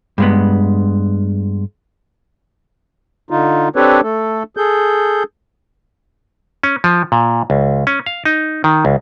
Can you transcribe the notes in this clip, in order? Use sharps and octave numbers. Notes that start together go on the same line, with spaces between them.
G2 G#3 B3
D3 D#4 F4
C4 D4 G4 A4 B4 C#5
A3 A4
G#4 A4 G6
C#4
F3
A#2
C#2
C#4
F5
D#4
D#3
C#2